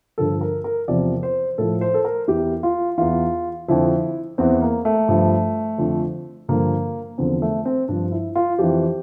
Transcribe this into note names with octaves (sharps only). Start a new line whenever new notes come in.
G2 D3 F3 A4
A#4
A#4
E2 C3 F3 D5
C5
A2 F3 A4
C5
A4
A#4
E2 E3 G4
F4
E2 E3 F4
F2 D3 F3 E4
E2 E3 C4
A#3
A3
G2 F3
F2 D3 F3
G2 D3 F3 A#3
E2 D3 F3 C4
A3
C4
G2 F3 D4
E4
F4
F2 E3 G4